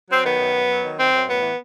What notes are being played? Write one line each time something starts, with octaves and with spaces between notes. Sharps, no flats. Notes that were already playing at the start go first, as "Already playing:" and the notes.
F#3 C4
D#3 B3
F#2
F#2
F#3
D#3
F#2 C4
F#2
A2 B3
E3